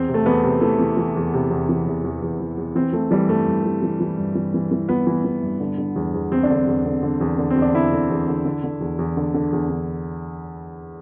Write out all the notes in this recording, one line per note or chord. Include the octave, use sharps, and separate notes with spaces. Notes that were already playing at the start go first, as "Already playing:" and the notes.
Already playing: E2 C4
C3
A3
E2 B3
C3
E3 A3
E3
E3
E2
C3
E2
E3
E2
E2
E2
E2
E2
E3 C4
E3 A3
E3 G3
G2 A3
G2
E3
E3
E3
G2
E3
E3
E3
E3 B3
E3
E3
G2
D3
D3
E2
E2
E2 C4
D4
D3 C4
E2
D3
D3
E2
D3
C4
E2
D4
D3 E4
D3
E2
D3
D3
D3
E2
E2
D3
D3
E2
D3